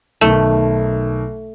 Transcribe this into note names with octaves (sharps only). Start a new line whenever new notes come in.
B1 D#3 A3